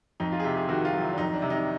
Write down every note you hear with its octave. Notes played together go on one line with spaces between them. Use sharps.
F2 D#4
F4
G#4
C3 G4
G#4
D#3 F#4
F4
F#3
E4
D4
F2 D#4
D4
C3
D#4